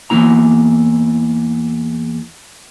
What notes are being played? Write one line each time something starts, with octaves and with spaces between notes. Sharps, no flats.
E2 A#3 E4 A#5